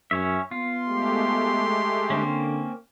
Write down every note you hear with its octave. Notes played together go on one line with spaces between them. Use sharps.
F#2 C#4 C#5 E5
B3 F4 C6
G#3 A3 G4
D3 A#3 C4 C#4